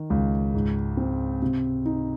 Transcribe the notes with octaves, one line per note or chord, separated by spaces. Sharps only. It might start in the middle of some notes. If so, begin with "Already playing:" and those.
Already playing: D#3
C#2
G#2
C4
C3
D#4